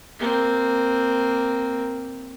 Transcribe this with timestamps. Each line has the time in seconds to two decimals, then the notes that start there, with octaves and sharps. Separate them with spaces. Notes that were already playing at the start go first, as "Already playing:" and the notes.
0.19 A#3 C4